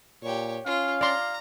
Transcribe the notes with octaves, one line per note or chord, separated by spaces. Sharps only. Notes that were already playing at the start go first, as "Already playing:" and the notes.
A#2 G4 C#5
C#4 F4 F5
D5 A#5 C6